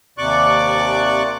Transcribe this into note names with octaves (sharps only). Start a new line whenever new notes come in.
D#2 C3 D5 C#6 D6 F#6